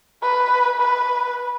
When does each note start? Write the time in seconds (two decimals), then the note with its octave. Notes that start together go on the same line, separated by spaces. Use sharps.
0.23 B4
0.80 B4